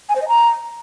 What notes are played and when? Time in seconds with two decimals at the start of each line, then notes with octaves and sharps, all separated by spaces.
0.09 G#5
0.15 C5
0.22 D#5
0.28 A#5